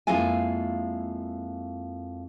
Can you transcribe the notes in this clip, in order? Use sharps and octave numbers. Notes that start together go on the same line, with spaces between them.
F2 G#3 A#3 E4 F4 G#5